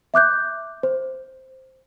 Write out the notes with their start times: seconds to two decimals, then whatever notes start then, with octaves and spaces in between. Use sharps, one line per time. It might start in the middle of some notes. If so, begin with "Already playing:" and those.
0.14 E5 D6 F#6 G6
0.83 C5